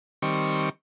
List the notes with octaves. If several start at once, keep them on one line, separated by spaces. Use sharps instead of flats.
D#3 G3 C4 C#6